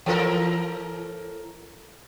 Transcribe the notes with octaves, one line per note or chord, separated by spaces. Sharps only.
E3 A4 A#4